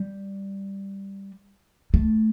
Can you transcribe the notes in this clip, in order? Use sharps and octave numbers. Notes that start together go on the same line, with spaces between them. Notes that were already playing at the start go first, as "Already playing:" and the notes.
Already playing: G3
A3